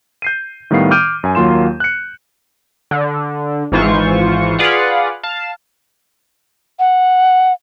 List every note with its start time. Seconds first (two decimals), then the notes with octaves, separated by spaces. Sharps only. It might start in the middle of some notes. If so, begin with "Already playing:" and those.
0.22 G6 C7 D#7
0.71 A2 D#3 G3 B3 F5 C7
0.91 D6 F6 G6 D7 D#7
1.24 F#2 G#5
1.35 D#2 F#3 A#3 F4 C6 E7
1.80 F#6 C#7
2.91 D3
3.72 G#1 G#2 E3 F4 C5 C#6
4.59 F4 G#4 B4 D5 F5 F#5
5.23 F5 A5
6.79 F#5